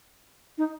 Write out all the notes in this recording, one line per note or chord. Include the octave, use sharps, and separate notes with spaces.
D#4